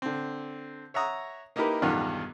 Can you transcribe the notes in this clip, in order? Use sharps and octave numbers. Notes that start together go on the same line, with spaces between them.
D3 C4
C#5 E5 F#5 A#5 D#6
A#3 D#4 E4 G4 A#4 B4
B1 E2 G2 B2 D#3 F4